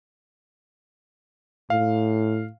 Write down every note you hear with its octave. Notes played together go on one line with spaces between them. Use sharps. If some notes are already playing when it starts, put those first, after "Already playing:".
A2 F5